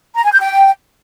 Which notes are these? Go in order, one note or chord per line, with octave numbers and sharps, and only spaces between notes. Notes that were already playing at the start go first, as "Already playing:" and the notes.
A#5
G#5
G6
G5